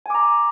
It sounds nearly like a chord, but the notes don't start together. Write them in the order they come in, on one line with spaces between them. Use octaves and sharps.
G#5 D6 A#5